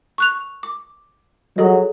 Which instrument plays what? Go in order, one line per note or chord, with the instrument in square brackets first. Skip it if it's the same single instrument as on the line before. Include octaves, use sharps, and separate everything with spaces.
[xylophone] C#6 F#6 F7
D6
[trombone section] F#3 [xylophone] G#4 A4 D#5